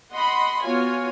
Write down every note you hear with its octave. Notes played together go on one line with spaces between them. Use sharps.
D#5 F#5 B5 C6
B3 F4 F#4 C#5 G#5